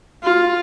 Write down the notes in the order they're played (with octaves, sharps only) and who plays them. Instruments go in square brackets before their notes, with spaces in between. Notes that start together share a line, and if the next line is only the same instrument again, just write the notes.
[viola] F4